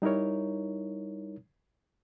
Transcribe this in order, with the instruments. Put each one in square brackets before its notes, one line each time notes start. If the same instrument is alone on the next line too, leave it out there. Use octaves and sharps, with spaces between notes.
[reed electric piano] G3 D#4 E4 A#4 C#5